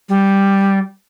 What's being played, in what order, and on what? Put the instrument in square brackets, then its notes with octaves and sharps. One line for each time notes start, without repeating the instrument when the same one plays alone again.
[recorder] G3